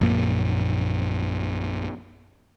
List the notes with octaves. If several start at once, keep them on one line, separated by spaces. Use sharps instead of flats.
A#1 F#2 A#2 A#3